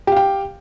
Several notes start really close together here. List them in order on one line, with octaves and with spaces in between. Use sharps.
G4 F5 G5